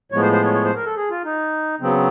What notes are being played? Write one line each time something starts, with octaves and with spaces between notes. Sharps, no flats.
A2 F3 G#3 B3 C#5
C5
C5
C#5
C#5
C5
A#4
A4
G#4
F4
D#4
C#3 F#3 B3 C4